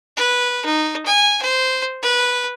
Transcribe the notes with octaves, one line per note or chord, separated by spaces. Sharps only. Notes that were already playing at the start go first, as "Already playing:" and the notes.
B4
D#4
G#5
C5
B4